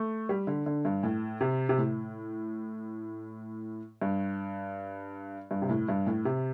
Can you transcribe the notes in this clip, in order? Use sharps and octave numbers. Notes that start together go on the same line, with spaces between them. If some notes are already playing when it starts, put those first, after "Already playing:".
Already playing: A3
G3
D3
D3
G2
A2
C3
C3
A2
G2
G2
C3
A2
G2
A2
C3